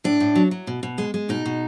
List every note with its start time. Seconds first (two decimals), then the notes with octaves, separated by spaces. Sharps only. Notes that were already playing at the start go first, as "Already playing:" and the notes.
0.04 A2 D4
0.20 A2
0.35 F#3
0.51 F#3
0.67 B2
0.83 B2
0.98 G#3
1.14 G#3
1.29 B2 D#4
1.45 B2